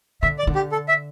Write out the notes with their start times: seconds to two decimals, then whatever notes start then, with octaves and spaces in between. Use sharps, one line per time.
0.22 D3 E5
0.39 D5
0.47 D3
0.55 G4
0.72 A4
0.88 E5